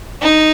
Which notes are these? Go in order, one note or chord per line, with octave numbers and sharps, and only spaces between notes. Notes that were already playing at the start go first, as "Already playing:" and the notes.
D#4